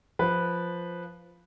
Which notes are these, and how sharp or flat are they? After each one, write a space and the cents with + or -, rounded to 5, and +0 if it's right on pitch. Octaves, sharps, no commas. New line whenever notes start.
F3 +0 B4 -5